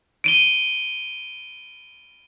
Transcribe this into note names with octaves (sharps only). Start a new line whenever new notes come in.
D7 D#7 G7